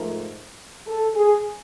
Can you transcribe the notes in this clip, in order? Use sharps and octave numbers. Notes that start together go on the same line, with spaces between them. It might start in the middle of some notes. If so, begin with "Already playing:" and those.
Already playing: G#2 F3 A3 A#4
A4
G#4